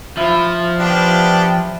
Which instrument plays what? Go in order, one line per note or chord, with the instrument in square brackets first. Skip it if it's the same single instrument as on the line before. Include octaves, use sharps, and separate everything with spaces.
[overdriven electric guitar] F3 F4 [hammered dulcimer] E4
[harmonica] B3 D4 G4